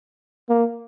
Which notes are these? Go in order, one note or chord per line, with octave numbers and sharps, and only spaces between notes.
A#3